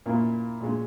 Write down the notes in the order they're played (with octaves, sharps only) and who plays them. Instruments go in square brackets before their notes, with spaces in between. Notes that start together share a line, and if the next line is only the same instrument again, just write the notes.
[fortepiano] A#2 A#3 C#4 E4
A#2 G#3 C#4